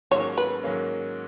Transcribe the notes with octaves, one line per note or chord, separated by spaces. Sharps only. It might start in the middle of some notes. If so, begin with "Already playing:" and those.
G#2 D#3 F#3 A#3 C#4 C#5
B4
G#2 D#3 F#3 A#3 C#4